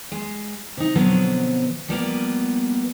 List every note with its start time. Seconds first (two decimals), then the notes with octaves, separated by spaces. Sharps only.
0.12 G#3
0.77 C3 D#4
0.95 B2 D3 F3 F#3 B3 C4
1.88 F3 G3 A#3 B3